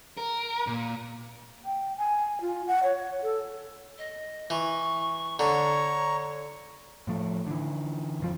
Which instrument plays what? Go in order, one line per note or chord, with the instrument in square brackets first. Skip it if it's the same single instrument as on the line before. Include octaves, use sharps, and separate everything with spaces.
[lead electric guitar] A#4
A#2
[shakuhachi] G5
G#5
F4
F#5
C#5
A4
[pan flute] D#5
[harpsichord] E3 [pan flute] C#6
[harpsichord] D3 [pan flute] C#5 [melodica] A#5 C#6
[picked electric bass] A2 F3 A3
D3 E3
E1 F2 F3